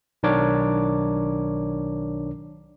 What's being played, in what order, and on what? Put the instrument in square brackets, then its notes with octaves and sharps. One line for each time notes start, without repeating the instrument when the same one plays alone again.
[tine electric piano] B1 D#3 D4 A#4 C#5 D6